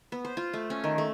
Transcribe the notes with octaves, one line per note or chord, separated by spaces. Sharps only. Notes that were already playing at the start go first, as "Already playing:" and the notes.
B3
C5
F4
A3
C#4
D#3
A3